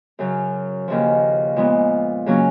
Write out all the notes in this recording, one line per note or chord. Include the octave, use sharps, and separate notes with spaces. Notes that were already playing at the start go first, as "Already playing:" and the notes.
F#2 C#3 F#3
D#2 C#3 F3
A#2 F3 G#3 B3
C#3 F#3 A#3 C#4